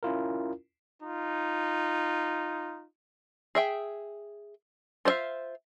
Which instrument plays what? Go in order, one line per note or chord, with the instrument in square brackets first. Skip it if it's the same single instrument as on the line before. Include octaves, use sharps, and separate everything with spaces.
[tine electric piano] C#4 E4 F4 A#4
[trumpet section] D#4 F4
[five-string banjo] G#4 E5 G5
F4 C5 D5 E5 F5